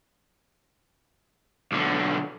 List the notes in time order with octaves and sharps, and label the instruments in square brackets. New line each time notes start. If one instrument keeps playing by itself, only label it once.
[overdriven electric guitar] B1 D3